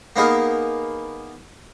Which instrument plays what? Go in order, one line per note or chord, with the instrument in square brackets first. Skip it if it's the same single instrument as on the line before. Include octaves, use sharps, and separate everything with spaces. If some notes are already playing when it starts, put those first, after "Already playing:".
[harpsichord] A#3 B3 D#4 G#4 A#4